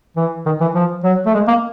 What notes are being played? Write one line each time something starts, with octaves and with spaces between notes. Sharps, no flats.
E3
D#3
E3
F3
F#3
A3
G#3
A#3